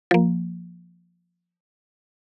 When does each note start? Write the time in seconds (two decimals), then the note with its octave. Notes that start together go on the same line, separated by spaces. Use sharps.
0.11 F3 A#3